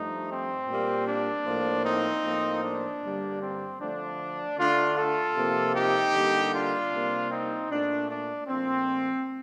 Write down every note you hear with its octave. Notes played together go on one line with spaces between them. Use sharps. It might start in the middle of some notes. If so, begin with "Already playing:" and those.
Already playing: G2 F3 A3 D#4
C4
A#2 G3 A#3
D4
A2 F3 A#3
C4 D#4
A2 F3 A#3
D4
G2 D3 G3 A#3
C4
D3 F3 A3 D4
D3 A3 D4 F4
F4 A4
C3 F3 A#3
D#4 G4
D3 G3 A#3
D4 F4
C3 G3 A#3
C4 D#4
A#2 A3 D4
D4
A#2 F3 A3 C4